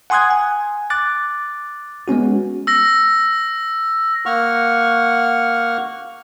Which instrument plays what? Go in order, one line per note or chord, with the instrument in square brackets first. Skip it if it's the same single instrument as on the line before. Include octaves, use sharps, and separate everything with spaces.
[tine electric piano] F#5 G#5 C6 D#6 F#6 G#6
G#5
D6 F#6 A6
G#3 B3 C#4 F#4
[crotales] E6 A#6
[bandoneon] A#3 F#5 C#6 F6